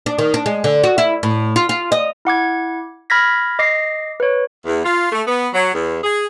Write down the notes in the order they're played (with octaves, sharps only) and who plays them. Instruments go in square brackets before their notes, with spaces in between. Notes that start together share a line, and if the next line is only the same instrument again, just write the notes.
[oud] D4
D#3
D4
G#3
D3
F#4
E4
A2
F4
F4
D#5
[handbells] E4 F#5 D6 G#6
B5 F6 G#6 A#6 B6
D#5 D6 A#6 C7
B4 C#5
[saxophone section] E2
F4
A3
B3
F#3
E2
G#4